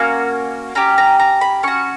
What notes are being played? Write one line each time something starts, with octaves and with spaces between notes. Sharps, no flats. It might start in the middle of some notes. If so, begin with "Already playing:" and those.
Already playing: A#3 C#4 F#4 A#5
C#4 G4 A#5
A#5
A#5
B5
C#4 F#4 C#6